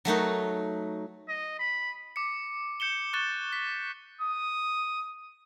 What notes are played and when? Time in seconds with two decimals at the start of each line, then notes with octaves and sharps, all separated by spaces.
0.05 F#3 A3 D#4 F#4
1.28 D#5
1.59 B5
2.16 D6 C#7
2.80 G6 C#7 E7 G7
3.13 C#6 F#6 A6 E7 G7
3.52 B6
4.21 D#6